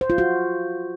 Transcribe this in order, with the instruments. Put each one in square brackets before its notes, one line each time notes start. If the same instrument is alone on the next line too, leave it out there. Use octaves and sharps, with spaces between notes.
[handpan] C5
F4
F#4